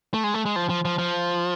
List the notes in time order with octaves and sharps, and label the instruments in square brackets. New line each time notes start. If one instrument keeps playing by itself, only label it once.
[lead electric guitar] A3
G#3
A3
G#3
F3
F3
F3
F3